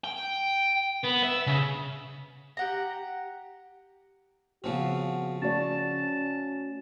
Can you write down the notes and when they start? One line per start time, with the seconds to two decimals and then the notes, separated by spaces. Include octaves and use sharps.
0.04 G5
1.04 B3
1.23 E5
1.47 C#3
2.57 G4 F#5 A#5
4.64 C#3 F3 B3 C4 F#4 F#5 G#5
5.42 A3 C#4 F#4 D5 A5